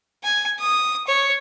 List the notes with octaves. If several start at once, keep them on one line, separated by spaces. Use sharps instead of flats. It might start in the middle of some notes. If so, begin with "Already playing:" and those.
G#5
D#6
C#5